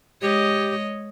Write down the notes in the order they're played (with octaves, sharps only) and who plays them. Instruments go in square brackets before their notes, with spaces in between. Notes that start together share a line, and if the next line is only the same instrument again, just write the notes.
[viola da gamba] G#3 C#5 D#5 [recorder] G4